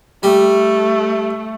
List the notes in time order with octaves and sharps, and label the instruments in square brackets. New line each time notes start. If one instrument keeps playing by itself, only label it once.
[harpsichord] G3 [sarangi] A3